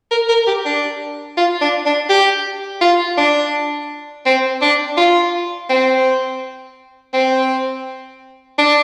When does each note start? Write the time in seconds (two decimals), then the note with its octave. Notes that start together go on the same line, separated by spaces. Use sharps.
0.11 A#4
0.29 A#4
0.47 G4
0.66 D4
1.37 F4
1.61 D4
1.85 D4
2.09 G4
2.81 F4
3.18 D4
4.26 C4
4.61 D4
4.97 F4
5.69 C4
7.14 C4
8.58 D4